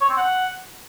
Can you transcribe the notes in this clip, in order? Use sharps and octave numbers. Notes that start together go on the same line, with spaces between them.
C#5
C4
F#5